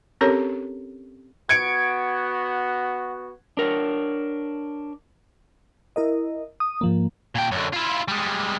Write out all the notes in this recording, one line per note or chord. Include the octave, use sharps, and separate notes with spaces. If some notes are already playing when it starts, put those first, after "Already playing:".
C4 C#4 G4 A4 A#4 C#5
B3 F#4 G#6 C#7 D7
D4 A#4 C#5
E4 A#4 D#5
D#6
G#2 F3 A#3
A#2 G5
F#2 D3
E4 F4
G3 G#3